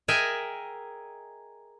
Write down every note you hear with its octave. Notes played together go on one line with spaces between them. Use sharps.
G#4 A#4 D#5 E5 G5 G#5